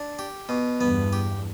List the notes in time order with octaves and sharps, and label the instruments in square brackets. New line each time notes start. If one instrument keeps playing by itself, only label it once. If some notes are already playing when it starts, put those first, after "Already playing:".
Already playing: [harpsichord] D4
G4
B2
[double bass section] E2 G2 [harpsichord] B3
[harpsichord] G4